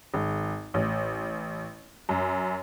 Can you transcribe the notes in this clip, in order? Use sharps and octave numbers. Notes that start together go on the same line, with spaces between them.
G#1
A1
F#2